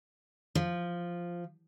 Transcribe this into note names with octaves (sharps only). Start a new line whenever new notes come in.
F3